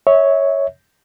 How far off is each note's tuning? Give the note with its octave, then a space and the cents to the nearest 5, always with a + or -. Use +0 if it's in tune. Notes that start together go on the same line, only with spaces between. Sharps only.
C#5 +0 E5 -30